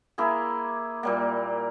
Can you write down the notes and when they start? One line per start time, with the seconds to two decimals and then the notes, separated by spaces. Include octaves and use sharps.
0.18 A#3 E4 G#4
1.03 A#2 G3 A#3